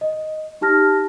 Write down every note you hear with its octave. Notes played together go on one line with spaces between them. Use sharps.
D#5
D#4 G4 A5 F6 A#6